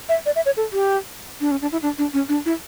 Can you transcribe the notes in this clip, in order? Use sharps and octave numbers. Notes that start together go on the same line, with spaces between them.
E5
D5
E5
C#5
A4
G4
D4
C#4
D4
E4
D4
D4
C#4
D4
E4